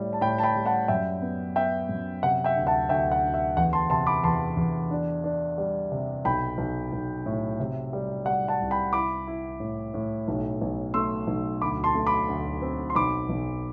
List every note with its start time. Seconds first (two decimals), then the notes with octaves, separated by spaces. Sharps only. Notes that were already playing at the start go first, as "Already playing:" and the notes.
Already playing: A2 G3
0.13 A5
0.21 A2 G5 B5
0.38 A5
0.43 G5 B5
0.55 G3
0.66 F#5 A5
0.88 F#2 E5 G5
1.22 B3
1.56 B3 E5 G5
1.89 F#2
2.23 C3 F#5
2.44 E5 G5
2.56 D2
2.67 F#5 A5
2.89 D2 E5 G5
3.12 F#5
3.24 D2
3.34 E5
3.57 E2 F#5
3.73 A5 C6
3.90 C3 A5 C6
4.06 B5 D6
4.23 E2 A5 C6
4.57 E2
4.91 D4
5.24 D4
5.58 G3
5.92 C3
6.25 B1 G5 B5
6.58 B1
6.92 B1
7.26 A2
7.60 C3
7.93 G3
8.26 G3 F#5
8.48 F#5 A5
8.60 C2
8.71 G5 B5
8.93 E4 B5 D6
9.27 E4
9.60 A2
9.94 A2
10.28 B1
10.61 B1
10.94 A3 C6 E6
11.27 B1
11.61 D2 B5 D6
11.84 A5 C6
11.95 A3
12.07 B5 D6
12.28 D2
12.62 C4
12.90 C6
12.95 B1 B5 D6
13.29 B1